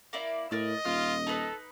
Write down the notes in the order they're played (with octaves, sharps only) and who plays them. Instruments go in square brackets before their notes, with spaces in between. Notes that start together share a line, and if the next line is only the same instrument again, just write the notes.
[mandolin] A#3 E4 D5
[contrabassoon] A2 [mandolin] A#4 D5 E6 [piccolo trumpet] D#5
[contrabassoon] D#1 [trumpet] F4 [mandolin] F6
[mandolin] D#4 B4 [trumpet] A4